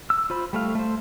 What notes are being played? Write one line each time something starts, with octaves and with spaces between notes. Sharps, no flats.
E6
F4 C5 B5
G3 A3 F5
A3 C5